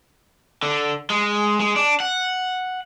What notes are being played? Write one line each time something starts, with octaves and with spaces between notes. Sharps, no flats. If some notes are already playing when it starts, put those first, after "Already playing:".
D3
G#3
G#3
D4
F#5